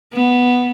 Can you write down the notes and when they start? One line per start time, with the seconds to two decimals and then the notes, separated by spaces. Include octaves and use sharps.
0.13 B3